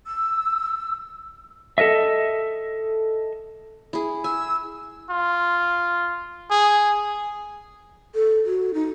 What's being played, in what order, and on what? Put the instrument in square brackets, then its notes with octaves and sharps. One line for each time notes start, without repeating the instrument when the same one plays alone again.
[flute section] E6
[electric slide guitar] A4 A#4 D#5 E5
[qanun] E4 G#4
[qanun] G#5 [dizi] E6
[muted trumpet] F4
G#4
[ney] A4
F#4
D#4